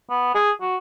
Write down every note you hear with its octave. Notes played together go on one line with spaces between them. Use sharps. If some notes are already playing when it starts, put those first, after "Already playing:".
B3
G#4
F#4